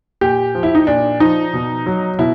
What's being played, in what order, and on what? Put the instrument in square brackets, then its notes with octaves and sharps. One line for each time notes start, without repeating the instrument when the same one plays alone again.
[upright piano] A#2 G4
F3
E4
D#4
A#2 D4
F3 D#4
B2
F#3
B2 E4